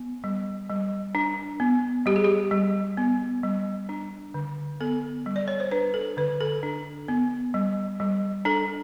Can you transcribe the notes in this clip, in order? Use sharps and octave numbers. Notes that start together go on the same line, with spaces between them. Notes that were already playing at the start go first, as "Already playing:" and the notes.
Already playing: B3
G3
G3
D4
B3
G3 G4
G#4
G4
G3
B3
G3
D4
D3
B3 A4
G3
D5
C#5
C5
D4 B4
A4
D3 B4
A4
D4
B3
G3
G3
D4 A4